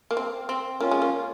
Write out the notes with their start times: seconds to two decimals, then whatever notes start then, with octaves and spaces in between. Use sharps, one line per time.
0.11 A#3
0.17 C4
0.49 C4
0.80 A#3 C#4 F4
0.91 G#3
1.02 A#3